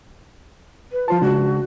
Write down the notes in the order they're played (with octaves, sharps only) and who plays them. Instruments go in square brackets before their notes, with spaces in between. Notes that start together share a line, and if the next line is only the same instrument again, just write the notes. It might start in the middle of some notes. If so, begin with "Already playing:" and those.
[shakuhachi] B4
[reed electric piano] F3 C5 A5 [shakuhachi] F4
[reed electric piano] C#3 G#3 D4 [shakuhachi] F#4